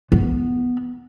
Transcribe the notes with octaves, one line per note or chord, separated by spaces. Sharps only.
B3